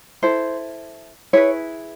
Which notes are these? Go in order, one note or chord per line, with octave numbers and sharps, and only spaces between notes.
E4 A4 C5
E4 G#4 B4 C#5